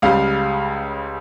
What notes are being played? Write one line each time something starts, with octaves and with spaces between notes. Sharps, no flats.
C#2 C#3 G3 F5